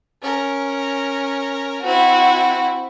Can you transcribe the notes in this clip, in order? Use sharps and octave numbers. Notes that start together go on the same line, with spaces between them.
C#4 A#4
C4 E4 F#4